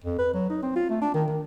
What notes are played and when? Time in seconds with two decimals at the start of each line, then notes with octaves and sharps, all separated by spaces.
0.04 F2
0.19 B4
0.34 F#3
0.50 D#4
0.63 C4
0.76 F4
0.90 A3
1.01 D4
1.14 D#3
1.28 D#3